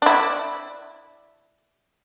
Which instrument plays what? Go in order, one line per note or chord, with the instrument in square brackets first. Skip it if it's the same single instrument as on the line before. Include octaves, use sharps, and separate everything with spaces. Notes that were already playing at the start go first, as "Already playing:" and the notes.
[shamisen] D4 E4